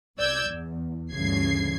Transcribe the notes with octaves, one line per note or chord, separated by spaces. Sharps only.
C2 D5 E6 G6 G#6
E2
D2 G2 C#3 E3 G#6 C7